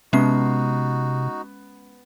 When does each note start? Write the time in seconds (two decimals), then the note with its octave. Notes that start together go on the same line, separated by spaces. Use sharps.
0.13 C3 G#3 B3 C#4 D#4 F#4 C7